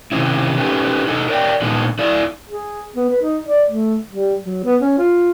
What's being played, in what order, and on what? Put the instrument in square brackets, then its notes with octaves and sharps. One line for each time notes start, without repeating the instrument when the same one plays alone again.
[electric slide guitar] C3 D#3 C4 C#4 E4
C#4 D#4 G4 A4 B4
D#4 G#4 A4 D#5
A#4 C#5 D5 G5
A#2 D3 G#3 B3 D#4 A4
E4 A4 D5
[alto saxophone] G#4
B3
B4
D#4
D5
A3
G3
F#3
B3
C#4
F4